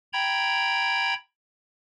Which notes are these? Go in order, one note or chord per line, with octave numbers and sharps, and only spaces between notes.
G5 A#5 B5 G#6